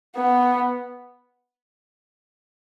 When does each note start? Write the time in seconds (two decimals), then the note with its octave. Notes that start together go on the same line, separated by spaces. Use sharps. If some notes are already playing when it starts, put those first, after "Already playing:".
0.16 B3